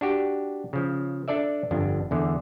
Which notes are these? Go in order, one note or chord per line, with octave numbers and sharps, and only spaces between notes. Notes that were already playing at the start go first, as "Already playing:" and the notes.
D4 F#4 G4
C#3 F3
D4 A4 D5 E5
G1 F2 D4
E2 D3